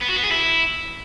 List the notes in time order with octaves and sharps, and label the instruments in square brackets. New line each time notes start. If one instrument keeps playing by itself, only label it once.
[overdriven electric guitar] B3
F#4
B3
G#4
E4